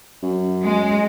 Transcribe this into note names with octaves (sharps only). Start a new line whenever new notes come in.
F#2
G#3